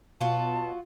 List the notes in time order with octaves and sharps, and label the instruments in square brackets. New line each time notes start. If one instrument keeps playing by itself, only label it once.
[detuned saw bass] B2 [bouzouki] F#3 F4 F#4 [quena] A5